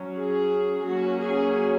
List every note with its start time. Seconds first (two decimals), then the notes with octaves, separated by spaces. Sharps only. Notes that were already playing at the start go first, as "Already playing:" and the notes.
Already playing: F#3 C#4
0.16 G#4
0.85 F#3 A#3 C#4 F#4
1.20 G#4